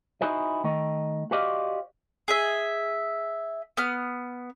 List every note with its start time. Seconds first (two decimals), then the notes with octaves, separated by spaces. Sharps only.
0.21 D#4 E4 F#4 G#4 C5 D#5
0.64 D#3 A3 D#5
1.31 F#4 G4 C5 D5 D#5 F5
2.28 G#4 D#5 E5
3.77 B3 F6